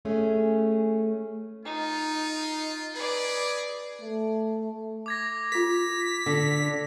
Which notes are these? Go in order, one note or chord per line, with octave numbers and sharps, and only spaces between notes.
A3 C#4 G#4
D#4 F4
G#4 B4 D5
A3
D6 G#6 A#6
F4 A4 B6
D3